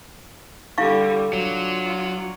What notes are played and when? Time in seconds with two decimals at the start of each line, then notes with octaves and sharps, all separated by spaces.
0.78 D3 G3 E4 F5 C#6
1.33 F#3 D4 F4